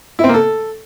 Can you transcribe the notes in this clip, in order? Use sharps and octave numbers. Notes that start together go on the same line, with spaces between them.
E4
C4
A#3
A4